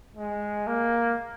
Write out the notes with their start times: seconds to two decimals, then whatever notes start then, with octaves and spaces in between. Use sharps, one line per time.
0.17 G#3
0.67 A#3